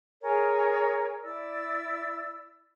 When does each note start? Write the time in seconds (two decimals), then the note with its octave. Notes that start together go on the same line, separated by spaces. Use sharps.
0.22 G#4 A#4 C#5 G#5
1.22 E4 D5 E6